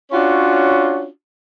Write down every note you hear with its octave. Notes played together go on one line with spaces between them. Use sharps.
C#4 D4 F4 F#4 C#5